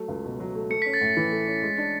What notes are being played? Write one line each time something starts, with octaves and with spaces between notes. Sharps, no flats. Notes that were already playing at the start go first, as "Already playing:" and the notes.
Already playing: F#3 A3
C#2
B2
F#3
A3
A3 C#7
B6
C#4
A6
A2
E3
A3
C#4
G#3
D4